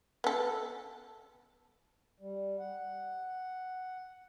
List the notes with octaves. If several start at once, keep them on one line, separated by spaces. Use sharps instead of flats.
B3 A4
G3
F#5